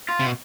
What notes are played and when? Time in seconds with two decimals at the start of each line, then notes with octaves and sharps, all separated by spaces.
0.09 F4
0.20 C3
0.26 B2